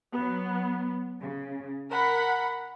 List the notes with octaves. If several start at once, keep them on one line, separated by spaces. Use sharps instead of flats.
F#3 B3
C#3
A#4 F#5 B5